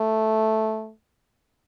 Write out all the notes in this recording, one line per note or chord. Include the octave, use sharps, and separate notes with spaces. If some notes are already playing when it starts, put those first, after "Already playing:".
Already playing: A3